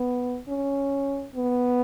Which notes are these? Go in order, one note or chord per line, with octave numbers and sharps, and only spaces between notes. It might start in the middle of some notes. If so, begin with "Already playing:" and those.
Already playing: B3
C#4
B3